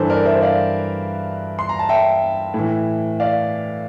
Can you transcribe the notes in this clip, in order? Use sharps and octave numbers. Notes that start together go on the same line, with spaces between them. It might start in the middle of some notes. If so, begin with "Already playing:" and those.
Already playing: G2 E3 A4 C5
A#4 D5
C5 E5
D5 F5
C6
A#5
A5
E5 G5
A2
E3
D5 F5